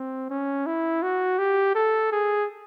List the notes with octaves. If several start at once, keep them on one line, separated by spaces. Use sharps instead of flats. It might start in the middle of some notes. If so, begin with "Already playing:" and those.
Already playing: C4
C#4
E4
F#4
G4
A4
G#4